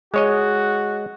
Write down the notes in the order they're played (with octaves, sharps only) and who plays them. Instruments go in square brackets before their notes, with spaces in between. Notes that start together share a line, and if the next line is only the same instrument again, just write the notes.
[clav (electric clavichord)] G#3 C#5 D#5 [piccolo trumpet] F#4